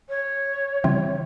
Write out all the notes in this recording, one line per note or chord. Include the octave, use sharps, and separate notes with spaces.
C#5
C#3 E3 G3 C4